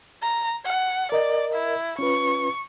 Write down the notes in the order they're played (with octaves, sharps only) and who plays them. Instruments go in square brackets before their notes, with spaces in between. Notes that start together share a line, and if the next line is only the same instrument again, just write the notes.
[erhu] A#5
F#5
[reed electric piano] A#4 D#5 [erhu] D5
[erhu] E4
[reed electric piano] C#4 F4 B4 [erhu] C#6